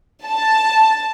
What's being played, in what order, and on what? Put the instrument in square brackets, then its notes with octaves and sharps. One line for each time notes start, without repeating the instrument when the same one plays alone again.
[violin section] A5